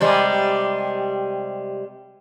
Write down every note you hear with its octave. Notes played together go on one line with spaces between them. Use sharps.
C3 G3 G#3